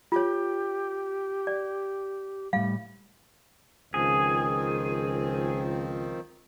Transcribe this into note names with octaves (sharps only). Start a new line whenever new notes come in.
F4 G4 C#5
D5
A2 G3 F5
C#2 D#3 F3 C4 G#4